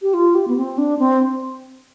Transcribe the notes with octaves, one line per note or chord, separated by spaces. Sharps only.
G4
F4
G4
B3
C4
D4
C4